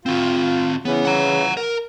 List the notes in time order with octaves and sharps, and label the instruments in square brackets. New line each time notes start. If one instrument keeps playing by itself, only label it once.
[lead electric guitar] C4 F#4 [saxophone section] F4
[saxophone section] C#3 E3 [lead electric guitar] B3
[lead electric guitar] F#5 A#5
A#4